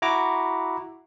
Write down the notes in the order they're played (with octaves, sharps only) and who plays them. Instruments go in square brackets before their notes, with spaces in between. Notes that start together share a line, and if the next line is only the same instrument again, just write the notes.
[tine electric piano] E4 F#4 A#5 D6